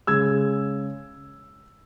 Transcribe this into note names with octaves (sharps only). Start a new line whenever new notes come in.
C#3 G#3 E6 G#6